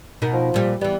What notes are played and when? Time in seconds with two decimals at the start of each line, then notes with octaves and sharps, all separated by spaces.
0.22 B2 D#4 A#4
0.33 F3
0.54 A#2 G3
0.81 E3 G3 B3